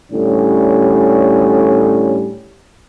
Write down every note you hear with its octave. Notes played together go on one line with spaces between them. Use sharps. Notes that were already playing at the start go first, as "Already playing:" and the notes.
A2 D3 G3 C#4